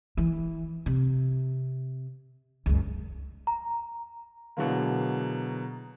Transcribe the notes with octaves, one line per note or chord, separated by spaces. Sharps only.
E3
C3
C#2 F#2
A#5
B2 D3 E3 F#3 G#3 A#3